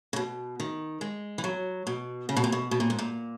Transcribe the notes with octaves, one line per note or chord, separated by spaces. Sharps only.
C#3
B2
D#3
G#3
E3
F#3
B2
C#3
B2
A#2
B2
B2
A#2
G#2
A#2